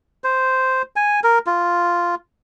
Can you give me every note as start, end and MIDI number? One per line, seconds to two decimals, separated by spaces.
0.24 0.82 72
0.96 1.20 80
1.24 1.39 70
1.46 2.15 65